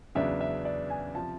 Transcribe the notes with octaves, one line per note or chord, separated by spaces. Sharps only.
E2 C#3 F#3 B3 D4 E5
E5
D5
G#5
C3 F3 A5